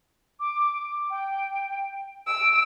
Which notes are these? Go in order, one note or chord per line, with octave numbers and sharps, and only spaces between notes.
D6
G5
E6 D7